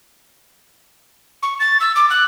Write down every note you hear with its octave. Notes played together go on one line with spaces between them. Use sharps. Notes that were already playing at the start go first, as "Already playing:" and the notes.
C#6
A6
E6
D6
F#6